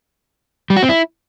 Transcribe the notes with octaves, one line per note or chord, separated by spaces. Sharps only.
G3
F#4
C4
E4